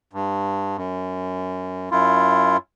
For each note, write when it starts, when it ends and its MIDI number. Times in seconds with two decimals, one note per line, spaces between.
0.13 0.77 43
0.77 1.89 42
1.91 2.57 42
1.91 2.57 64
1.91 2.57 65